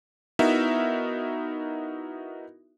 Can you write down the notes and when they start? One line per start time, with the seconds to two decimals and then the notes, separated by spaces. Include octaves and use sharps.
0.39 B3 D#4 E4 F#4 A#4 E5